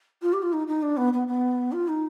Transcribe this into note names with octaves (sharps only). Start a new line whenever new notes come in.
F4
G4
F4
D#4
D#4
D4
B3
B3
B3
F4
D#4